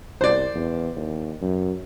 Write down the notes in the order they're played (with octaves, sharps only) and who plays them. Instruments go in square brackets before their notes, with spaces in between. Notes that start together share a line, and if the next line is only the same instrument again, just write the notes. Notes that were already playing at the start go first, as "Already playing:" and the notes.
[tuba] C2 [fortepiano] C5 D5
[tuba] E2
D#2
F#2